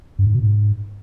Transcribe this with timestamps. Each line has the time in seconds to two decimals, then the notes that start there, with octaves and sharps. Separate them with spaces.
0.19 G2
0.27 G#2
0.34 B2
0.42 G#2